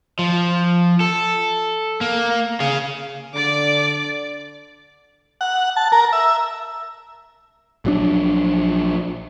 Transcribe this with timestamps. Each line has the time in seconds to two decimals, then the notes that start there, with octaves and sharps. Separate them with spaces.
0.19 F3
1.00 A4
2.01 A#3
2.60 G#4 F5
3.34 D3 D5 D6
5.41 F#5
5.76 A5
5.92 A#4
6.13 E5
7.85 A#1 F#3 D4